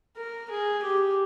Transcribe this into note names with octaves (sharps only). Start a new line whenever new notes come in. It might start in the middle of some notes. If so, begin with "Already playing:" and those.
A#4
G#4
G4